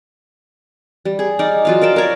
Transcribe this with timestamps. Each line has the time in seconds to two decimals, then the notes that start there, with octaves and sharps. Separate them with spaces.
1.05 G3
1.19 G#4
1.39 D#4 D5 F5
1.65 F#3 F4 F5
1.82 A#4 D5 G5 A5
1.96 A#4 C#5 D5